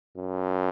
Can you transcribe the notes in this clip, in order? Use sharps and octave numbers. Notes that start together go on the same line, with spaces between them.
F#2